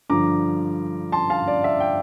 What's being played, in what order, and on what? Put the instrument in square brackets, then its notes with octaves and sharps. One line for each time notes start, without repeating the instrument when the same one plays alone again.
[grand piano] G2 D3 F3 A#5 D6
A5 C6
F5 A5
D5
E5
G5